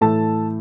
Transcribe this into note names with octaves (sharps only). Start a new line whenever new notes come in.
A2 E3 A3 A4 A5